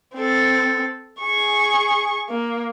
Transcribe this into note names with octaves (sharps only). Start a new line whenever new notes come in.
C4 A4
G#4 C#6
A#3